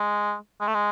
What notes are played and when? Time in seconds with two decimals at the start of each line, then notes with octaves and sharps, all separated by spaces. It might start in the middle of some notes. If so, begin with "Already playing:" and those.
Already playing: G#3
0.60 G#3
0.68 A3
0.74 G#3